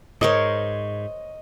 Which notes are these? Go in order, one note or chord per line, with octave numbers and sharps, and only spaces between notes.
G#2 A#4 C5 C#5 D#5